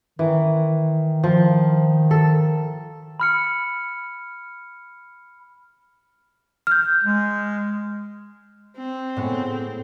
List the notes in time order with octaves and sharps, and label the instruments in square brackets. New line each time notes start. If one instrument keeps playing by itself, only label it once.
[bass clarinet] D#3 [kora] E3
[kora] F3
A4
[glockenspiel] B5 F6 C#7
[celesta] F6 G6
[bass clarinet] G#3
[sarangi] C4
[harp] A2 G#3 B3